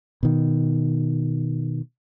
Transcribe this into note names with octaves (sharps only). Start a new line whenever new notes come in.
B2 D#3